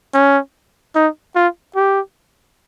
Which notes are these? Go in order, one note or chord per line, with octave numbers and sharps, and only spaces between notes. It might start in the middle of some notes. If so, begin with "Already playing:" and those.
C#4
D#4
F4
G4